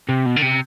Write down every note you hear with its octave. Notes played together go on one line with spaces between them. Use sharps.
C3
B2
D3
C3